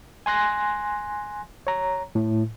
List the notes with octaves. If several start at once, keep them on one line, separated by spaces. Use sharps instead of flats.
G#5 C6 F#6 A#6
C#5 A#5
A2